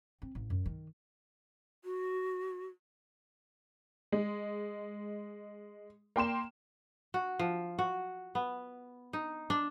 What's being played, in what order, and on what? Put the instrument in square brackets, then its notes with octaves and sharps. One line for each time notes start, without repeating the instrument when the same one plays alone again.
[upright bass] C4
A1
F#2
D#3
[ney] F#4
[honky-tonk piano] G#3
A#3 G5 C6 E7
[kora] F#4
F3
F#4
B3
D#4
D4